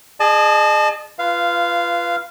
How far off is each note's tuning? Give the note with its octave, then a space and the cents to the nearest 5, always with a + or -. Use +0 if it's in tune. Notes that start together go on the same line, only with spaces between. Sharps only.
G#4 +0 D#5 -40 A5 -25
F4 -25 B4 +0 F5 -10